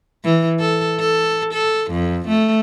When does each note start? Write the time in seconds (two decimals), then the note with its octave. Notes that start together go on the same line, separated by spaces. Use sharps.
0.24 E3
0.60 A4
0.99 A4
1.54 A4
1.91 F2
2.28 A3